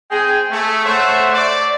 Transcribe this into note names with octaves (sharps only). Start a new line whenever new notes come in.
C4 G#4 G5 G#5
A3
A3 C5 C#5 E5 F#5
D5